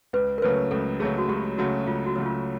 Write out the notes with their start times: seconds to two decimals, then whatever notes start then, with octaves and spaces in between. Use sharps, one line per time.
0.13 C#2 B4
0.38 A#4
0.42 C#3 F#3 A3 B4
0.71 C#2 A4
1.00 C#3 F#3 A3 G#4
1.18 F#4
1.29 C#2 G4
1.58 C#3 F#3 A3 F#4
1.87 C#2 F4
2.06 F#4
2.16 C#3 F#3 A3
2.26 F4